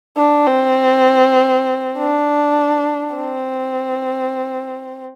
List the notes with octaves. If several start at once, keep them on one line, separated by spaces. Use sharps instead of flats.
D4
C4
D4
C4